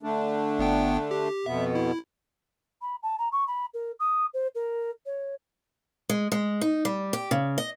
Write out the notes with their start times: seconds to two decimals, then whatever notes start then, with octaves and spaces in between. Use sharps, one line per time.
0.03 D3 A3 D4
0.59 G1 B3 G5
1.11 G4
1.46 F2 B2 B3 E5
1.75 E4
2.81 B5
3.03 A5
3.18 A#5
3.32 C#6
3.47 B5
3.74 A#4
3.99 D#6
4.33 C5
4.55 A#4
5.06 C#5
6.09 G#3
6.32 G#3
6.61 D#4
6.85 G3
7.13 G4
7.31 C#3
7.58 D#5